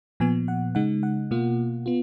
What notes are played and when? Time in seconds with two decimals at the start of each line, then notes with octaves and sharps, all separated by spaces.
0.20 A#2 F3 B3 G#5
0.48 F#5
0.75 C#3 G#3 D#4 F#5
1.03 F#5
1.31 B2 A#3 F4
1.86 B3 F4